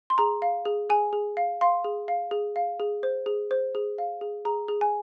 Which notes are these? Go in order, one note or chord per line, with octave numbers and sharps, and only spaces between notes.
C6
G#4 A#5
F5
G#4
G#4 G#5
G#4
F5
F5 C6
G#4
F5
G#4
F5
G#4
C5
G#4
C5
G#4
F5
G#4
G#4 A#5
G#4
G#5